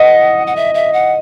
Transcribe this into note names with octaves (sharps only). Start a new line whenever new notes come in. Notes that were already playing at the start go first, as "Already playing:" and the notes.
Already playing: D#5 F#5
F#5
E5
E5
F#5